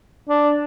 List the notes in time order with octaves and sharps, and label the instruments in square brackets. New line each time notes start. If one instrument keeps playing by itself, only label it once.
[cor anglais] D4